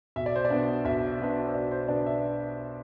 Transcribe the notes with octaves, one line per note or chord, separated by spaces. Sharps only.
B1 E5
D5
C5
D5
B2 B3 D4
B1 E5
B2 B3 D4
C5
B1 D5
C5
B2 B3 D4 D5
E5